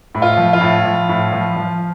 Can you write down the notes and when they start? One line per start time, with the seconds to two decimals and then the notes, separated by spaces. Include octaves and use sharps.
0.15 A2
0.22 F4
0.37 F3
0.53 F4
0.61 A2
0.85 F3
1.09 A2
1.33 F3
1.56 F3